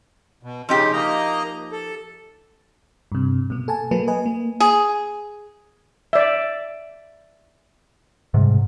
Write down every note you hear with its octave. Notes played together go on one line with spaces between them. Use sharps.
B2
C#3 F3 D#4 G4
A#3 D#5 A#5
A4
G2 C3
B2 A#3
A4 G#5 A5
F#3 A#3 A4 B4
B4 D#5 G#5
A#3
G#4
D5 E5
G#2 C3 G3